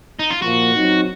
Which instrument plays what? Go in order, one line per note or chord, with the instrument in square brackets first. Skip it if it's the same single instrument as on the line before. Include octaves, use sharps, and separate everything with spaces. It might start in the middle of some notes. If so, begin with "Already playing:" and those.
[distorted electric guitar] D#4
F4
[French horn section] A#2 F3 A#3 [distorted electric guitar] F#4
[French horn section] F#3 C4 D#4